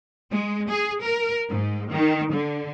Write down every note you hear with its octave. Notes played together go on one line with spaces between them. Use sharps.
G#3
G#4
A#4
G#2
D#3
D3